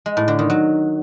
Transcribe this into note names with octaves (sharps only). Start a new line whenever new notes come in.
G#3
A2
D3
D#3
F#3